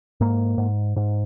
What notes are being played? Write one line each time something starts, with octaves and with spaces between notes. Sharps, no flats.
G#2 A#3
G#2
G#2